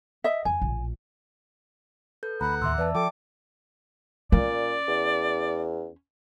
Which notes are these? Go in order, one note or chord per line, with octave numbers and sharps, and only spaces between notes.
D#5 E5
F2 G#5
A#1 A2
A4 B4 G6
D2 F#5 A#5 B5
D1 D#2 E5 C6 D6 E6
E2 B4 D5 E5 A5
F3 A4 G5 A5 D6
A#2 C#4 D5
E2